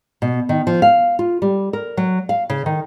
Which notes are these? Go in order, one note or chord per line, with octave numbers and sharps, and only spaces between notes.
B2
D#3
F3
F5
F4
G3
A#4
F#3
F5
C#3
D#3